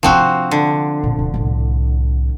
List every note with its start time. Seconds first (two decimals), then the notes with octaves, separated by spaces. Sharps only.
0.03 C3 F3 C4 D4 F#4
0.51 D3
1.03 A#2 E3
1.19 D1
1.34 C2 A2